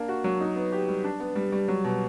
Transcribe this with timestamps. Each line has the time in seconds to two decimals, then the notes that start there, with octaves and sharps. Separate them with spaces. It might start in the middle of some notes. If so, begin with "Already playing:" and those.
Already playing: A#3 D4
0.09 F#4
0.24 F#3
0.41 D#4
0.56 B3
0.72 G4
0.88 G3
1.04 D4
1.20 B3
1.36 G3
1.52 G3
1.68 F#3
1.84 B2